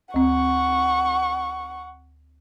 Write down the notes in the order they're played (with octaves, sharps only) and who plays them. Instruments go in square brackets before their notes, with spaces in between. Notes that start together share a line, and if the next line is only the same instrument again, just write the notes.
[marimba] D2 C4 [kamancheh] F#5 C#6